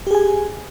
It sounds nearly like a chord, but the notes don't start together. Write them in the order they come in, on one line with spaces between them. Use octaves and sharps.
G4 G#4 G#5